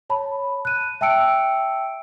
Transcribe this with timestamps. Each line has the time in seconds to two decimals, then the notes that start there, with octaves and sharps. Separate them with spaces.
0.10 C#5 A5 B5
0.65 F#6 D#7
1.01 E5 G5 A5 E6 C#7 D7